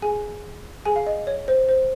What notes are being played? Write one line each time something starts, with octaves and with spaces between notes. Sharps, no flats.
G#4 G#5
G#4 G#5
F5
D#5
C#5
C5
C5